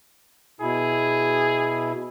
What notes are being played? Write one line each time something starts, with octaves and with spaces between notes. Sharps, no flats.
B2 E4 G#4